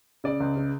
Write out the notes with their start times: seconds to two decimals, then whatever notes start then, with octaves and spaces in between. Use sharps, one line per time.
0.24 C#3 D5
0.40 C#2
0.56 C#3